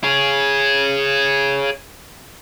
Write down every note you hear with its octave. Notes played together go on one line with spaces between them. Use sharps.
G#4 C#5